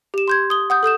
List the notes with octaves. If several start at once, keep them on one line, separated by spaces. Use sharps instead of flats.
G4 E7
C6 G6 G#6
D#6 G7
F#5 D#6 G6
A4 D#6 G6 E7